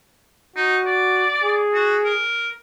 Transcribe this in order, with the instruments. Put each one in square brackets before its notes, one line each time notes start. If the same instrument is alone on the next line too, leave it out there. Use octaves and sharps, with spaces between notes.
[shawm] D#4 [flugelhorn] F#4
[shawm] D5
[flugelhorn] G#4
[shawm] F#4
A#4